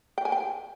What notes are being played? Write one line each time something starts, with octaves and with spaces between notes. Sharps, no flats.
G5
G#5
G5